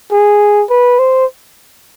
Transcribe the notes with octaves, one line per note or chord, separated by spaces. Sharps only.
G#4
B4
C5